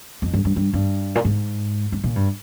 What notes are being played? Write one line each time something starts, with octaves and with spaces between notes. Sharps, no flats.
F2
G2
G2
G2
G2
A#2
G#2
G#2
A#2
G2